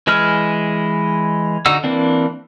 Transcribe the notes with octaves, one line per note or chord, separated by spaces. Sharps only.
E3 G#3 E4 G#4 F6
D3 D#4 F#4 F#5 E6
E3 A#3 C4 D4